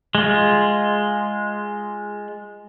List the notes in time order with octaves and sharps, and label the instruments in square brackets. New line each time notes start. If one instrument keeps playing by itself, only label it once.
[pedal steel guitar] G#3 F4